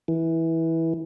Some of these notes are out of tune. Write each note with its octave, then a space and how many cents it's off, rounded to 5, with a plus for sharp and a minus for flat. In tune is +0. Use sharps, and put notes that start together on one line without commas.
E3 -15